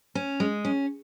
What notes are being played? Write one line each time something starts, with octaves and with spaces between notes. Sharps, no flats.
C#4
G#3
C#4